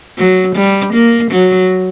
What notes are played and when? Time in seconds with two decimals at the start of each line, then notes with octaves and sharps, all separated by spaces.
0.18 F#3
0.55 G3
0.93 A#3
1.31 F#3